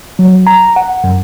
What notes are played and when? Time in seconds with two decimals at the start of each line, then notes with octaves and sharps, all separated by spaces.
0.19 F#3
0.47 A#5
0.76 F#5
1.04 F#2